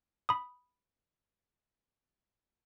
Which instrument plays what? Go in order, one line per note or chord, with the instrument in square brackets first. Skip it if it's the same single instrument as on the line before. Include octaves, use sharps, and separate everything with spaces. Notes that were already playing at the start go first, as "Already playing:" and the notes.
[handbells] B5 D#6